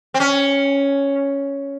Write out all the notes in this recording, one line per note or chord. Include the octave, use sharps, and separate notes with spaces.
C4
C#4